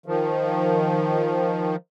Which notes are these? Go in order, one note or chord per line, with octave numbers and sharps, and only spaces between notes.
D#3 F3